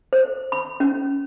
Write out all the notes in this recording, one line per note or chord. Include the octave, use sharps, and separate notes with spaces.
C5
B5
C#4